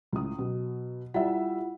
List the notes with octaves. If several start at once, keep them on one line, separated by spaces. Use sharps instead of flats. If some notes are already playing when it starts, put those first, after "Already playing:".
C#2 A2 D#6
B2 F#3
G3 E4 F4 E5 F#5